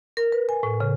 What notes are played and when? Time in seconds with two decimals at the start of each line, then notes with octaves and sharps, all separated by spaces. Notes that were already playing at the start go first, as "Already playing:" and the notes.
0.17 A#4
0.32 B4
0.49 G#5
0.63 A2
0.80 C#3